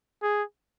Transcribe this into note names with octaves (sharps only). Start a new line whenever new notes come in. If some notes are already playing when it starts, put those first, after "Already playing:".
G#4